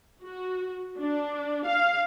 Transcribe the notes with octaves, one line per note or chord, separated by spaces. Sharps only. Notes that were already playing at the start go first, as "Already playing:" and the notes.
F#4
D4
F5